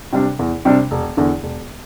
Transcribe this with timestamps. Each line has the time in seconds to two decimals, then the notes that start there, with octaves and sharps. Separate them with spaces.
0.13 C3 G3 D4
0.39 E2
0.65 C3 G3 D4
0.91 E1
1.17 E2 D3
1.43 E1